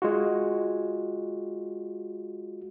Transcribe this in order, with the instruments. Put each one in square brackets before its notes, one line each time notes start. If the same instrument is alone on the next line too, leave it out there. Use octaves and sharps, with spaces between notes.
[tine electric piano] G#3 F4 F#4